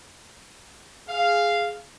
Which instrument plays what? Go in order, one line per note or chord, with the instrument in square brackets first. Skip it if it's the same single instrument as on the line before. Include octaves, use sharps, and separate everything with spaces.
[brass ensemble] G#4 F5